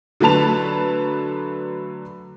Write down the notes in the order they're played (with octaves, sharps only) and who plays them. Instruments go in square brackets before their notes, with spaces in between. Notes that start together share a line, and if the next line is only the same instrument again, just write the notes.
[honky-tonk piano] D3 F#3 A3 B4 A5 F7